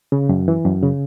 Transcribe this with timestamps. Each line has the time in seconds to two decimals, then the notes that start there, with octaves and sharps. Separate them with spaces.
0.12 C#3
0.29 F#2
0.48 E3
0.65 F#2
0.83 C#3